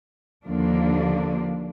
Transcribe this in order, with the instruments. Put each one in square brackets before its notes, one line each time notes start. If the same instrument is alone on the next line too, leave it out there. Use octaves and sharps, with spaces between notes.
[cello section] D#2 D3 F3 A#3 D4